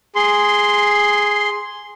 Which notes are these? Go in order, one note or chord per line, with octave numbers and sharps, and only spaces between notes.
G#4 C6